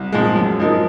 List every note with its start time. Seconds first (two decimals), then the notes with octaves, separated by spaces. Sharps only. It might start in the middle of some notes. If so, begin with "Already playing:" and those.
Already playing: C2
0.12 A#2 F3 G#3
0.36 F#2
0.60 F3 G#3 D#4 A#4